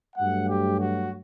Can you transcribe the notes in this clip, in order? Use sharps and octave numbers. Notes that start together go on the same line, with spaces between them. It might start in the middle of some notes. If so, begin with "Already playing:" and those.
G2 F#3 A3 F#5
G4
F#4